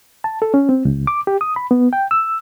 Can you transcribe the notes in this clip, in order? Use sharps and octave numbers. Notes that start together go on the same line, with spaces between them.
A5
A4
C#4
C4
C#2
D6
G4
D#6
B5
B3
G5
E6